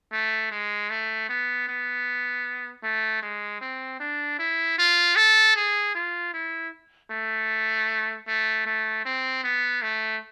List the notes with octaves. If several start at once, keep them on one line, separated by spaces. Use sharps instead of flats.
A3
G#3
A3
B3
B3
A3
G#3
C4
D4
E4
F4
A4
G#4
F4
E4
A3
A3
A3
C4
B3
A3